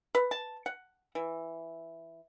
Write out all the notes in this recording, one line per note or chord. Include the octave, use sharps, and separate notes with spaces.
B4
A5
F#5
E3